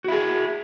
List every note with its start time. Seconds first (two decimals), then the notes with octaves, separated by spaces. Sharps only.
0.04 F#4
0.08 E4
0.12 G#4